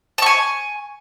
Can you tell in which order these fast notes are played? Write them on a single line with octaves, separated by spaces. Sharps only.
A5 C#6 G#5